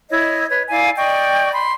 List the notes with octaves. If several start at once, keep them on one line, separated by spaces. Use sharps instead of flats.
E4 C#5 D#5
B4 C#5
E4 D5 F5 G#5
D5 D#5 G5 C#6
B5 C6